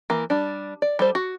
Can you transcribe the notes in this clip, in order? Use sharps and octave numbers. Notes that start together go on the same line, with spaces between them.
E3 A#3
G3 D4
D5
G3 A4 C5
F#4